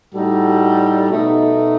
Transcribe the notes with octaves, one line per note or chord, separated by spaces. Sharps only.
A2 G3 D#4 F#4 A4
B2 A3 D#4 F#4